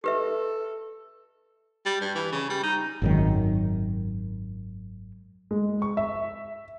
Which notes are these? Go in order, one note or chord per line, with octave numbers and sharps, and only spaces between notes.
G4 A4 B4 E5
G3
G2
E3
C#3
G3
D#4
G#1 F#2 D#3
G#3
C#6
E5